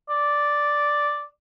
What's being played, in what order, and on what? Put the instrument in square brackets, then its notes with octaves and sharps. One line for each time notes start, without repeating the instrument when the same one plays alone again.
[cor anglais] D5